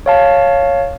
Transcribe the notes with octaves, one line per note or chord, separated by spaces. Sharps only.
C#5 F5 A5